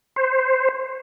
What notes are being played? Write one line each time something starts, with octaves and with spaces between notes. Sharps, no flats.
C5